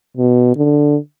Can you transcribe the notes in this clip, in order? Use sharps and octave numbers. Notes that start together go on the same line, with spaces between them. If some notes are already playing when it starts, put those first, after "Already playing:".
B2
D3